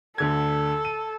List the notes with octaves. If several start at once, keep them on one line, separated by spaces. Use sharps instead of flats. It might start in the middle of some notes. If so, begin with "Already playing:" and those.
D2 D3 A4 G#6
D#7